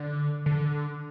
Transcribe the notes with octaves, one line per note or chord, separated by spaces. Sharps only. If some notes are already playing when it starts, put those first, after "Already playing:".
Already playing: D3
D3